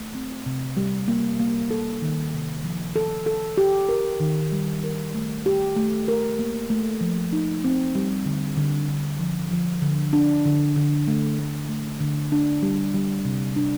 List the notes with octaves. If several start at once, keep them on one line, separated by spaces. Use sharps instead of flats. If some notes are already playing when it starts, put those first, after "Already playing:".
Already playing: A3
C4
C3
G3
A#3
A#3
A4
D#3
C3
F3
A4
A4
G4
A#4
D#3
G3
A#4
A3
G4
A3
A#4
A#3
A3
F3
D#4
C4
G3
D3
D3
D3
F3
F3
D3
D4
D3
D3
A3
A3
A3
D3
D4
G3
G3
C3
D4